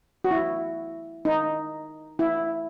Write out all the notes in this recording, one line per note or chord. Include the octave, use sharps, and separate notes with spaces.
F#4
E4
D#4
E4